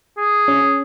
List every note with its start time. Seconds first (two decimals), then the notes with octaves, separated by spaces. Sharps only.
0.17 G#4
0.48 C#4